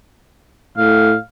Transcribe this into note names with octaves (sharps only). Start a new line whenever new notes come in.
A2 F5